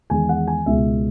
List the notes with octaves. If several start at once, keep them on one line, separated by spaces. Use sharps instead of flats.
E2 D#3 G#3 G#5
F#5
G#5
C#2 B2 G#3 E5